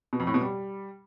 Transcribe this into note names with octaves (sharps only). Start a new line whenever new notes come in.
B2
F2
A2
B2
G3